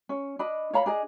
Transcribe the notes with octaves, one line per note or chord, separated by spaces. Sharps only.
C#4
D4 D#5 B5
C#5 F5 A#5 B5
D4 G#4 D#5